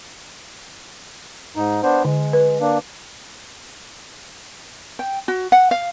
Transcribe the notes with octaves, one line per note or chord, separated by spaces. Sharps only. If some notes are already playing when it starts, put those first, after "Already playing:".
G#2 D#4
B3 D4 C5
D3 G#3
B4
A#3 D4
G5
F#4
F#5
F5